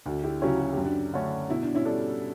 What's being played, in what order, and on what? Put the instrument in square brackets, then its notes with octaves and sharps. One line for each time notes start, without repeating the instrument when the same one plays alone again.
[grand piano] D2 [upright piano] D4 F#4
[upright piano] E4 G4
[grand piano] C#3 F#3 C#4 [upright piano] E4 G4
[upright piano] F#4
G4
[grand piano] F#2
[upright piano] D4 F#4
[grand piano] D3 A3 C#4
[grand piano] B2 [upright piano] E4
[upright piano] D4
C#4 E4
[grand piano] G3 D4 A4